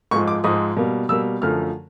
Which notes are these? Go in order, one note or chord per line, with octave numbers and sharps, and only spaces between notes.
G#2 F3 G#3 C#6
D6
G#2 F3 G#3 D#6
B2 G3 A#3
B2 G3 A#3 E6
F#2 D3 F3 A3 F6